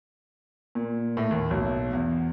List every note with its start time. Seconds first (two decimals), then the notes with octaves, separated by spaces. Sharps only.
0.75 A#2
1.17 A2
1.31 D#2
1.51 B1
1.93 E2